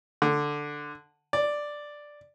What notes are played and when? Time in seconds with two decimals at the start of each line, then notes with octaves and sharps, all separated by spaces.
0.22 D3
1.33 D5